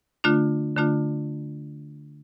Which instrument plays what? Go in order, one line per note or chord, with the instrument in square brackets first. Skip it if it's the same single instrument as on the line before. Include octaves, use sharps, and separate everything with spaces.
[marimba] D3 A3 D4 F4
D3 A3 D4 F4